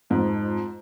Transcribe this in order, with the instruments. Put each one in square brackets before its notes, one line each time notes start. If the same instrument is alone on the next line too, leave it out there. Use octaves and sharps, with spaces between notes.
[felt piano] F2 G#2